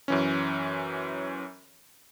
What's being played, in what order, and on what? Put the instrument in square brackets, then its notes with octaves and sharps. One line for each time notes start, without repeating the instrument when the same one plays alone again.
[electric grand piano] F#2 E3 C#4